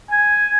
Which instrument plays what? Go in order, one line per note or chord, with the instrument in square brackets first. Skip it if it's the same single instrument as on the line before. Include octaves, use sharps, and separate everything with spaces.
[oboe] G#5